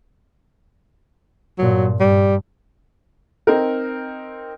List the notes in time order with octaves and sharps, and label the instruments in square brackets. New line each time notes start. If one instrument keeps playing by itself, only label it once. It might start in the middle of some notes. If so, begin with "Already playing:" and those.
[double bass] G2 A#2 [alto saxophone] F#3
[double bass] G2 [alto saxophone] G3
[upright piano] C4 D#4 A#4